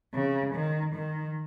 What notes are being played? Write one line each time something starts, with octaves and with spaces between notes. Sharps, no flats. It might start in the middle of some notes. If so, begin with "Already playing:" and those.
C#3
D#3
D#3